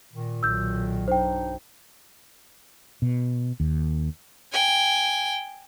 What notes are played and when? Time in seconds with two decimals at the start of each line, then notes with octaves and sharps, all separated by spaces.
0.13 A#2 D#3
0.43 B1 F#3 E6 G6
1.08 G2 D4 D#4 C5 G5
3.02 B2
3.60 D#2
4.52 G5 G#5